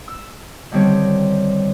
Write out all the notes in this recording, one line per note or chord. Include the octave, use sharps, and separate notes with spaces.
E6
D3 D#3 G3 C4 C#5